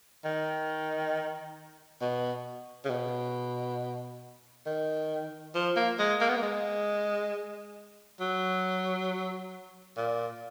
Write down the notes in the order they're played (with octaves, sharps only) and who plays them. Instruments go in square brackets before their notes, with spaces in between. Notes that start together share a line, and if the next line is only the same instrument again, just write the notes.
[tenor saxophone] D#3
B2
C#3
B2
D#3
F3
A#3
G#3
A#3
B3
A#3
G#3
F#3
A#2